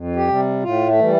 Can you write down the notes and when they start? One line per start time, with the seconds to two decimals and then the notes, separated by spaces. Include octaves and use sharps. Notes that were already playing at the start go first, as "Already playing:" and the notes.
Already playing: F2
0.16 G4
0.28 C3 G3
0.63 A2 F4
0.87 A3
0.99 E3 G3